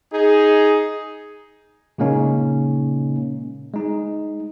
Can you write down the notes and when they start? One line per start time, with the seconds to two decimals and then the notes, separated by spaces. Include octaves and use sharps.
0.12 D#4 G#4
1.98 A#2 C#3 G#3 A#3 C#4 D#4
3.74 G#3 D#4